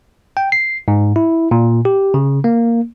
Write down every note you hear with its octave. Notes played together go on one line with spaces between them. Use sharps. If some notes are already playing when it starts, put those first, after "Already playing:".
G5
C7
G#2
E4
A#2
G4
C#3
A#3